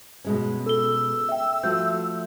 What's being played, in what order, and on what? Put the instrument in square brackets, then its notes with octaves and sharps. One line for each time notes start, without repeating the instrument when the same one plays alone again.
[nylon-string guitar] B2 G#3 C#4
[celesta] A4 G7 [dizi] E6
[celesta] E5 G5
[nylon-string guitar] F3 A3 F#4 [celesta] G6